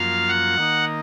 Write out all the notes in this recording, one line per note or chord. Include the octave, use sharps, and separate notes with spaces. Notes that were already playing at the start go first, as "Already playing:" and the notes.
Already playing: F#2 F3 A#3 F4 F5
F#5
D#3 A#3 D#4